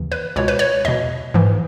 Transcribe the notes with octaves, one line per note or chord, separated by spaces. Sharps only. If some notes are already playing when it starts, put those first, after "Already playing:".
Already playing: D#2 C#3 E3
B4
C#2 B2 C#5
B4
C#5
E2 B2 D#5
G#2 E3